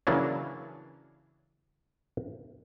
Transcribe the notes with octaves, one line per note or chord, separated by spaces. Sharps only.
C#3 E3 F#3 A#3 C#4 D4